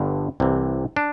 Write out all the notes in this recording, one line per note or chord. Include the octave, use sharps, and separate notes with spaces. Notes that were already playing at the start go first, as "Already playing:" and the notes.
Already playing: G1 G2 D3
C2 C3 E3
D4